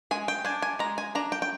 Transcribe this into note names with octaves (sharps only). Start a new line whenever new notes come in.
G#3 G#5
G5
D4 G#5
G#5
G#3 A#5
G#5
D4 A#5
G5
G5